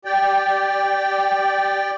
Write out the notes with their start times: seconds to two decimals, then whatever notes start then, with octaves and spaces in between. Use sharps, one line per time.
0.05 G4 D5 G5